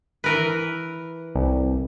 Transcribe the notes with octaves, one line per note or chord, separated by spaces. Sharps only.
E3 A#4 B4
C2